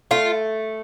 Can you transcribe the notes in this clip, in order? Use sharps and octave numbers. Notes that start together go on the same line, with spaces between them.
A3 F4